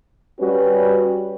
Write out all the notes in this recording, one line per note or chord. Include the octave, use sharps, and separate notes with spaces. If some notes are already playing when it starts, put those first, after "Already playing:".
G3 C#4 F#4 B4